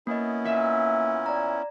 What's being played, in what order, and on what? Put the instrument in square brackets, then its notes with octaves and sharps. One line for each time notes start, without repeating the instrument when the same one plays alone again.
[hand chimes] A#3 D#5 [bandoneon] B3 C#4 E4
[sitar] A#2 E5
[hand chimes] D5 A#5